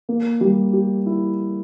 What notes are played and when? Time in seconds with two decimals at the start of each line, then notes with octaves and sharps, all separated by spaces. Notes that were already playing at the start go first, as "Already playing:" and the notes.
0.09 A#3
0.41 G3
0.73 G4
1.06 E4